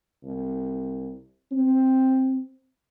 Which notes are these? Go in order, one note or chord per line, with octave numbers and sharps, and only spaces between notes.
C2
C4